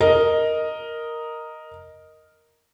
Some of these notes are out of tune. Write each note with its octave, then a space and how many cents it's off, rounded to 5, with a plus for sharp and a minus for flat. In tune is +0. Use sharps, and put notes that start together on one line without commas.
A#4 +0 D#5 +0